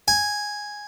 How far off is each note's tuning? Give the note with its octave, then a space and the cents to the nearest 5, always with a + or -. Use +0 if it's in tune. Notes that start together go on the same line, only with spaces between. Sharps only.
G#5 -5